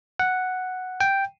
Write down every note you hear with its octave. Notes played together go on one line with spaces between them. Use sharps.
F#5
G5